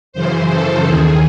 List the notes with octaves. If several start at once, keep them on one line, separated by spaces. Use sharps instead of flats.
F#2 C#3 E3 C5
A4
D#2 D#3 G#4